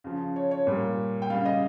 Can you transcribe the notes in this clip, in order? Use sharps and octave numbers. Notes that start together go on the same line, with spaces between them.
C#3 F3
C#5
C#5
A#2 G3
G5
C#3 G3 F5
D#5